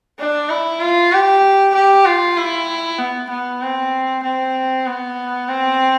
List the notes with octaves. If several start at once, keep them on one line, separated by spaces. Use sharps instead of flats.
D4
E4
F4
G4
G4
F4
E4
B3
B3
C4
C4
B3
C4